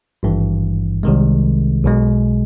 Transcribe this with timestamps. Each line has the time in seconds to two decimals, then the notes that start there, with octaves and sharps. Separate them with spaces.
0.23 G#1 G2 E3
1.03 C2 C3 D#3 G#3
1.84 B1 B2 G#3